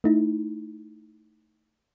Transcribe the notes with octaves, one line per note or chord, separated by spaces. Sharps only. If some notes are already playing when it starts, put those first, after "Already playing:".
A3 D#4 E4